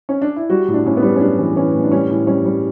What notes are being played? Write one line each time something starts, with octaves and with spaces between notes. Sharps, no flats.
C#4
D4
E4
G3 F#4
A2
D4
A2 C#4
B3
G3
C#4
G3 D4
E3
E3 C#4
A2
D4
G3 C#4
A2
G3 C#4
G3